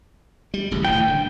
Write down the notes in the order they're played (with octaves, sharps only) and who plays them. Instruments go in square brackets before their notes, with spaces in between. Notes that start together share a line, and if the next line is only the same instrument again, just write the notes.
[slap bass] G3
D#1 A1 C#3
[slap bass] D#1 A2 E3 [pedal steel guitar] G5
[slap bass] D3